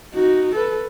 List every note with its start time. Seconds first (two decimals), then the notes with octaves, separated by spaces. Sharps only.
0.14 D#4 F#4
0.56 A4 B4